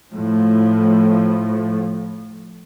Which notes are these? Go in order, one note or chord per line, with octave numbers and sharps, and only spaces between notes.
A2 F3